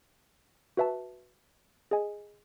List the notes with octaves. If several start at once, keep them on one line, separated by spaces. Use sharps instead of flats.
F#4 B4 E5 A5
G#4 D#5 G#5